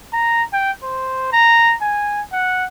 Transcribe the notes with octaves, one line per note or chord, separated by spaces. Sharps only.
A#5
G5
C5
A#5
G#5
F#5